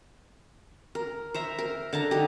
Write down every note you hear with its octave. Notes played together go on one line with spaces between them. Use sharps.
A#4
C5 E5 A#5
A#4
D3 A5 A#5
D#4 G4